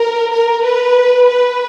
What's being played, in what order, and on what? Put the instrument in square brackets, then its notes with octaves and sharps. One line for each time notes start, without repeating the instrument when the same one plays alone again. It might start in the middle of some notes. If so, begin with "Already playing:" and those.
Already playing: [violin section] A#4
A#4
B4
B4